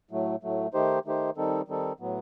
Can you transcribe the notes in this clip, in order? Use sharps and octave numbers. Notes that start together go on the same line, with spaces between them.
A2 F#3 A3
A2 F#3 A3
D#3 A3 D#4 G4 C5
D#3 A3 D#4 G4 C5
D#3 G3 C4 D#4 A4
D#3 G3 C4 D#4 A4
A2 F#3 B3